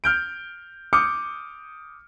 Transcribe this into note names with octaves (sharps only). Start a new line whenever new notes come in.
F6 G6 D7
D6 D#6 F6 G6 C#7